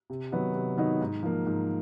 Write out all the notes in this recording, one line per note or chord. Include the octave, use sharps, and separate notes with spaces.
C3
D#3 F#3 B3 D#4
C3
D#3 F#3 B3 D#4
G#2
F3 A#3
G#2